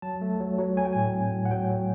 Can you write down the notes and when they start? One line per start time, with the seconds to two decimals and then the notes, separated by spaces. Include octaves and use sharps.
0.02 F#3 A5
0.22 A3
0.40 F#3
0.59 F#3
0.77 F#3 G#5
0.85 G5
0.93 A2 G#5
1.14 C4
1.32 A2
1.45 F#5
1.51 F#3 G5
1.69 F#3